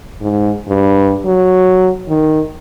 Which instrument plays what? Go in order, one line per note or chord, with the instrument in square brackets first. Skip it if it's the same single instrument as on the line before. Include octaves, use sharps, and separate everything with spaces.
[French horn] G#2
G2
F#3
D#3